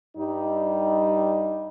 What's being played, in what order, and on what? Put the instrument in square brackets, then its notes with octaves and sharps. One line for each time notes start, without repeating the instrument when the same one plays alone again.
[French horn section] G2 G3 D#4 D#5